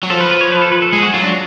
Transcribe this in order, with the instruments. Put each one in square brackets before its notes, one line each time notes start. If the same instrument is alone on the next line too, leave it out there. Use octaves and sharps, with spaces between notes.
[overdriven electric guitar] F#3
[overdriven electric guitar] F3 [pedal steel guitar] A4
[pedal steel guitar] B4
B4
C#5
B4
A4
B4
A4
[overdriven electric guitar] G#3 [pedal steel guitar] G#4
[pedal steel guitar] F#4
[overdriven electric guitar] F#3 [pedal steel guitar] F4
[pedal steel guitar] D4